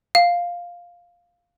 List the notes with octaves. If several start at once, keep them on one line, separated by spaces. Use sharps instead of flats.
F5